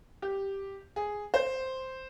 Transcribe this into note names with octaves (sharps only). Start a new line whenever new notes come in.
G4
G#4
C5